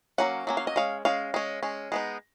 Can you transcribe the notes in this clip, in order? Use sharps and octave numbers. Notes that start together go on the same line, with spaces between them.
F#3 A#3 C#4 F#5
F#3 A#3 C#4
F5
D#5
G#3 C#4 F5
G#3 C#4 F5
G#3 C#4
G#3 C#4
G#3 B3 D#4